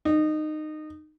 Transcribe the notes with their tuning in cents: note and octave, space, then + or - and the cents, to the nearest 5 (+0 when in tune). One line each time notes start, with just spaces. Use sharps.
D#4 -20